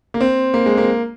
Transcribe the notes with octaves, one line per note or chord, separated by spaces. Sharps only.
A#3
C4
A#3
G#3
A#3